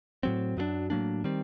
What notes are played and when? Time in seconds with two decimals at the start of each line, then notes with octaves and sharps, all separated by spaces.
0.23 A2 F#3 C4
0.57 F#2 F#3 A3 D4
0.90 A2 F#3 A#3 D4
1.24 D#3 G3 C4